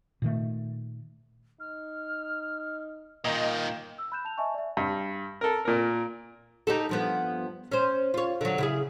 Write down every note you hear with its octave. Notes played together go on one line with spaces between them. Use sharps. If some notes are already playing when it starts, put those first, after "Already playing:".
A#2 D#3 A3
D#4 F6
A#2 D#3 A#3 D#5 G5
E6
B5 F#6 G6 E7
A5 F7
D#5 E5 G#5 A5 C#6
D5 E5
G2
A4 A#4
A#2 A#4
D#4 G4 A4
G2 F3 B3
C#4 C5
F4 C#5
D3 F#3
C#3 E4 G#4